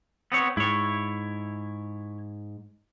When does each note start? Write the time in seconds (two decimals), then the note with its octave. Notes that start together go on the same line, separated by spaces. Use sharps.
0.32 B3 C4 C#5
0.57 G#2 E4 C#5